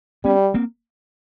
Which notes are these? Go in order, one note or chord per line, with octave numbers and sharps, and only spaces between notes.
G3 B3 C#4
A#3 C4